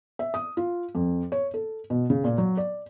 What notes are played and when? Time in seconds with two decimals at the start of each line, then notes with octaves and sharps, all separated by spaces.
0.19 E5
0.34 D#6
0.57 F4
0.95 F2
1.32 C#5
1.54 A4
1.90 B2
2.10 C#3
2.24 A#2
2.38 F#3
2.57 D5